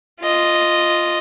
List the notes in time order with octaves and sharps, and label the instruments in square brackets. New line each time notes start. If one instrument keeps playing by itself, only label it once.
[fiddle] F4 D#5